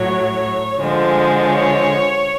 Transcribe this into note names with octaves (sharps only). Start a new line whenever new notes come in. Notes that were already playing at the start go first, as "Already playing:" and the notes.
Already playing: A2 F#3 C#5
D3 F3 G#3
C#5